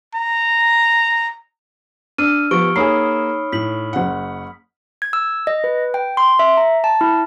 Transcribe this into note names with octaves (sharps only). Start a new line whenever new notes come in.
A#5
D4 E6 F6 D#7
F3 B3 G4 C#6 C#7 D7 G7
A#3 D#4 G#4 C#5 B5 C#6 D#6 C7
A2 B6 F#7
F#1 F#5
G#6
E6
D#5
B4
G5
C6
E5
A#5
A5
E4